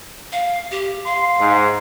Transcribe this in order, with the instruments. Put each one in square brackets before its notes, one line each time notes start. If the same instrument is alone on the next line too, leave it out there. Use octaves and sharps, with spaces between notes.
[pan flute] F5
G4
[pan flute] F5 [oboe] C6
[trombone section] G#2